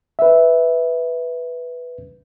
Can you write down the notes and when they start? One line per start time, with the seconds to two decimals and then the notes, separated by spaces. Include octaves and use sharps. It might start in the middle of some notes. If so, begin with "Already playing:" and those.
0.19 B4 E5